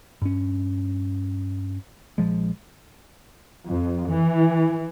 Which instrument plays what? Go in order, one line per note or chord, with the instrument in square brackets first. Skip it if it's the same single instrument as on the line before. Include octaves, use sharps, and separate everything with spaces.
[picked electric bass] G2 C#4
A#1 F3 G#3
[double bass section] F2
E3